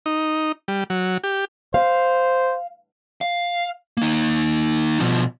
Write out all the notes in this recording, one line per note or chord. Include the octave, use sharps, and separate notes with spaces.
D#4
G3
F#3
G4
C5 F5
F5
A#3 D#4
B2 F3